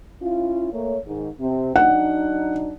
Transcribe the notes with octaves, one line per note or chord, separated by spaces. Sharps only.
C#4 E4 F4
A3 A#3 C#5
G#2 D#3
C3 C4
F#3 D4 D#4 F#5